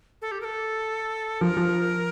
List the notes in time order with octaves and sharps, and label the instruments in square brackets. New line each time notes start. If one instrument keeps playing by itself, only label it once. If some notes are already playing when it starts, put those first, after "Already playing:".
[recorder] A4
G4
A#4
A4
[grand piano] F3 [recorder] A#4
[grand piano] F3